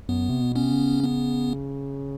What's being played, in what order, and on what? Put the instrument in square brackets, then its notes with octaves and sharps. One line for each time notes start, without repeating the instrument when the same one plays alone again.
[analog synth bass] F#2 [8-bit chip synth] B3
[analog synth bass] C3
B2
[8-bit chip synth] B3 C#4
[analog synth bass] C3
C#3
[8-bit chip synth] B3